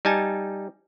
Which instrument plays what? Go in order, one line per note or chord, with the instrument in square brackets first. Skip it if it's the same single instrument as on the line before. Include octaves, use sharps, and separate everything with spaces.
[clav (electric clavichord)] G3 D#4 G#5 A5